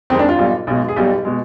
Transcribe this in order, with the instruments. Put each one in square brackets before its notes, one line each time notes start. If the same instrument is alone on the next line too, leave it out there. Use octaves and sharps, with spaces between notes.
[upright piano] F2 D#3 G#3 C4
D4
F4
B1 B2 G3
B1 B2 G#3
G#4
B1 B2 G3 G4
B2 G#3